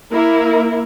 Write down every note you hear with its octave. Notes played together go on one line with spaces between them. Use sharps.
A#3 E4 A#4